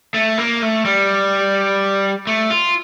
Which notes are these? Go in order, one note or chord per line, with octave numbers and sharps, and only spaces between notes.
A3
A#3
A3
G3
A3
F4